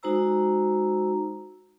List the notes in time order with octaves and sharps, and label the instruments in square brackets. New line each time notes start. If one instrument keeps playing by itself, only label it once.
[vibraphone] G#3 D#4 F#4 C5 A#5 E6